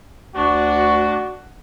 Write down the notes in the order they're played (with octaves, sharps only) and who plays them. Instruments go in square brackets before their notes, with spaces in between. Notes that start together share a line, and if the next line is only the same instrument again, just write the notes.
[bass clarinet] D2 [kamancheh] D4 [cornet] F#4 [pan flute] C#6